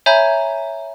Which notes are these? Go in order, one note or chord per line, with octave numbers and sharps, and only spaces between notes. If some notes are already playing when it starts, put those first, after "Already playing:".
C#5 E5 G#5 A#5 B5 G6